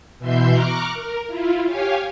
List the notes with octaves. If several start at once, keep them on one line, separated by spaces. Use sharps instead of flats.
B2 E3 E5 C6 G6
A#5 C#6 D6 F6 F#6
A#4
E4 F4
G4 C#5 F5 G#5